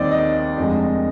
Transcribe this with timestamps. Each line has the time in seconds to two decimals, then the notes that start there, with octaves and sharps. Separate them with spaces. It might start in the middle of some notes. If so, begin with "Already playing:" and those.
Already playing: D#2 D#3 G3 C4 D5 D#5
0.11 D#5
0.57 F1 F2 D3 G#3